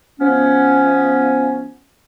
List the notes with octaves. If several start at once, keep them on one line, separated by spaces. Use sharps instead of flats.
F3 B3 C#4